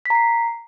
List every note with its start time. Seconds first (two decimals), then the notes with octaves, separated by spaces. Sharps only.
0.06 B6
0.10 A#5
0.15 C7